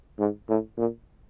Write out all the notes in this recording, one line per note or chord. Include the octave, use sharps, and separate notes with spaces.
G#2
A2
A#2